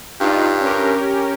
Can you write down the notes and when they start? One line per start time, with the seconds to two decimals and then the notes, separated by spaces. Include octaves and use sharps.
0.21 G2 D4 D#4 F4
0.61 C#4 G4 A#4